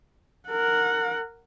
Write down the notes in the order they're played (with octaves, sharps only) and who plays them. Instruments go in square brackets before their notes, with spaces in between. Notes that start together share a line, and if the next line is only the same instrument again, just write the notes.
[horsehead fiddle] A#4 F#5